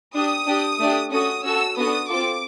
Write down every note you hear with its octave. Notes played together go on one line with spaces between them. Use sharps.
D4 G4 D#6
D4 G4
A3 D4 G4
C#4 F#4 A4 D#6
C#4 F#4 A4 E6
B3 D4 F#4 A4 D#6
C4 F4 A4 D6